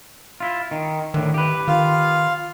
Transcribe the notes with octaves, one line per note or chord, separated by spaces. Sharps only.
E4 F4
D#3
A2 D3 D#3
G4 B4
D#3 F4 F5